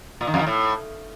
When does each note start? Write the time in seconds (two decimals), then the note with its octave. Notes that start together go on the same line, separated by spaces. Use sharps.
0.21 A#2
0.27 D#3
0.34 F2
0.40 D#3
0.47 A2